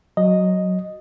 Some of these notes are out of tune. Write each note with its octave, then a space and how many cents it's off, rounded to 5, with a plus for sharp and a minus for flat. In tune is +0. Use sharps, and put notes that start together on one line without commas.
F#3 +0 D#5 +0